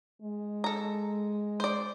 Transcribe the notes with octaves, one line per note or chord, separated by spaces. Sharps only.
G#3
A4 A#5
C5 D5